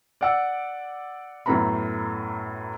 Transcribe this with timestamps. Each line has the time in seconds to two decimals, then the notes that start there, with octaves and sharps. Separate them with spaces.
0.21 D5 F#5 E6
1.46 F#2 A2 A3 B3 A#5 B5